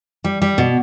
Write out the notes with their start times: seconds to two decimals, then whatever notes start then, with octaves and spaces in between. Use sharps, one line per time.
0.24 G3
0.42 G3
0.58 B2